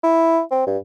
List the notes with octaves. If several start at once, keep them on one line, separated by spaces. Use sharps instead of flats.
E4
C4
G2